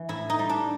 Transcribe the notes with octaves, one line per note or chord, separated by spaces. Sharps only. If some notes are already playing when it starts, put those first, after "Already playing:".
Already playing: E3
A2 E4
D#4
G3
D4